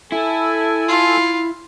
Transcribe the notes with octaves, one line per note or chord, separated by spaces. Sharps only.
E4 A4 G#5
F4